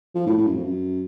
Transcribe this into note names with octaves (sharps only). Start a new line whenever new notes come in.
F3
A2
A2
F#2
F2
F#2